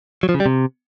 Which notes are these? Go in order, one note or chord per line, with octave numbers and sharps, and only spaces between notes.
F#3
F3
C#3
G3
C3